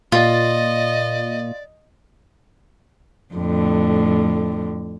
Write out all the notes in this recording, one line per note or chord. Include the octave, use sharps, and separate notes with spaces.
A#2 F4 D5 D#5
F2 A2 D3